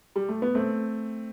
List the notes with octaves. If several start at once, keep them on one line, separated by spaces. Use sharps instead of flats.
G3
A3
B3
A3 C4